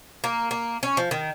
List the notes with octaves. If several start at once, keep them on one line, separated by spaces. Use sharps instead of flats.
A#3
A#3
C#4
F3
D#3